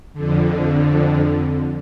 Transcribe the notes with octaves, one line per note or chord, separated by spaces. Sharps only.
F2 D3